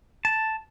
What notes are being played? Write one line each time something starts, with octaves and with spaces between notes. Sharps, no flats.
A5